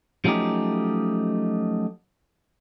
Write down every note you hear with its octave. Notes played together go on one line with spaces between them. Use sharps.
F3 F#3 A3 C#4 D#4 G4